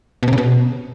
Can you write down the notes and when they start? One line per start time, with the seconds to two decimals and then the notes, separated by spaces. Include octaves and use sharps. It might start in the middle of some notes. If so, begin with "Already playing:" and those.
0.23 B2
0.28 C3
0.33 C#3
0.38 B2